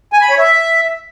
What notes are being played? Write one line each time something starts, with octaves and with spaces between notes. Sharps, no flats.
G#5
B5
C#5
E5